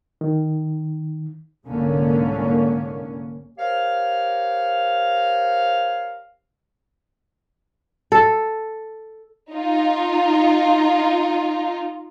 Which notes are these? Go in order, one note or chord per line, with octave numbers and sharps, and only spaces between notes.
D#3
C2 G#2 D3 A#3 C#4
G4 A#4 C5 C#5 F5
A4
D#4 F4